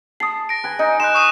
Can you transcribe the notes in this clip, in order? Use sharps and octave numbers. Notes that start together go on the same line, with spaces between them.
A5 D#6 C7
A#6 D7
B4 G#5
D#4 D#5
C6 F#6 E7
C#6 D#6 E7